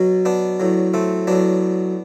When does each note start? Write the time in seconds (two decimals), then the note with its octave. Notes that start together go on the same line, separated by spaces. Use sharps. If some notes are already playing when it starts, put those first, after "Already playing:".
Already playing: B2 F#3
0.25 B3 D4
0.60 A2 F#3
0.94 A3 C4
1.27 A2 F#3 B3 D4